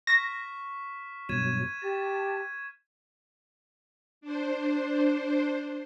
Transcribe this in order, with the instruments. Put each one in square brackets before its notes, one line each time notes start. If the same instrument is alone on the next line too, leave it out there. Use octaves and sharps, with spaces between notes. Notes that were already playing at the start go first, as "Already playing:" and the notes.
[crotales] C#6 F6 B6 [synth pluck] A#6
[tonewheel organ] G2 B2 F#3 [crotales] G#6 D#7 E7
[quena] G4 [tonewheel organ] A5
[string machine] D4 C5